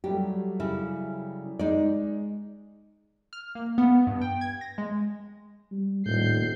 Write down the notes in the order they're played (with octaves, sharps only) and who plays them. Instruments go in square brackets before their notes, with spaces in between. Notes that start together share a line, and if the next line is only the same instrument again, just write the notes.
[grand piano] F#3 G3 A3 [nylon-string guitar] G4
[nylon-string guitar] C#3 E4
[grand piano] G#3 [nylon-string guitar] D#4 D5
[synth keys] F6
A#3
B3
G2
G5
G#6
A#6
G#3
[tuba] G3
[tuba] D#1 [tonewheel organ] A2 [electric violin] G6 C7